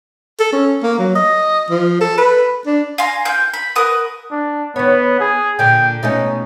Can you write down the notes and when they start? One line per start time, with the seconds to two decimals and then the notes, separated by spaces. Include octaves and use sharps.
0.39 A4
0.53 C#4
0.83 A#3
0.99 F#3
1.15 D#5
1.70 F3
2.01 A4
2.18 B4
2.66 D4
2.98 F5 G#5 A#5 C6
3.25 F4 G5 G6
3.54 B5
3.75 F#4 A#4 B4 D#6
4.31 D4
4.76 D#3 B3 C#5
5.20 G#4
5.59 A#2 D3 G5
6.03 B2 A3 C#4 D#4